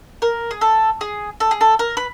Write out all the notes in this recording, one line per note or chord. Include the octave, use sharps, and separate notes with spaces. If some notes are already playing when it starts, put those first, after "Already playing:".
A#4
G#4
A4
G#4
A4
G#4
A4
A#4
B4